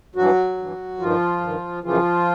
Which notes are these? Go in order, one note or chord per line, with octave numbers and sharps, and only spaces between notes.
G2 E3 F#3 F#4
G2 E3
G2 D#3 F3 F4
G2 D#3
F#2 C#3 E3 F3 F4